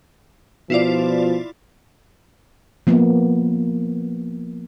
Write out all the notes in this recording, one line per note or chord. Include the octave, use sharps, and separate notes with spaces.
B2 F3 E4 F4 D5
F3 A#3 B3